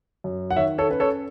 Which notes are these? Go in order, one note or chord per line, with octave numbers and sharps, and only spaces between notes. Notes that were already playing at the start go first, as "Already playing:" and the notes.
F#2
F#5
D#3 C#5 E5
A4 C#5
C#4 B4
A4 C#5